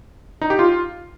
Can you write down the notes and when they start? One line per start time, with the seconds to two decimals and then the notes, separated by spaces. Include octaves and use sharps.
0.41 D#4
0.50 G4
0.59 F4